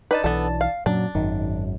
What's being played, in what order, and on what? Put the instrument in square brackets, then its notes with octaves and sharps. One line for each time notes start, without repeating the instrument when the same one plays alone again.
[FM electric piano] D4 A5 [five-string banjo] D#4 B4
[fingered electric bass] B1 E3 [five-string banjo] B3 A4
[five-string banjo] F5
[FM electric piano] F#2 [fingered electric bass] A#2 F#3 [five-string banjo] D4
[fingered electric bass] G#1 F#2 [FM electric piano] D#3